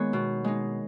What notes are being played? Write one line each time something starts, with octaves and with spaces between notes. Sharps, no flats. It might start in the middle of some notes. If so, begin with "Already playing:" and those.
Already playing: D#3 G#3 B3 C#5
B2
G#3 D#4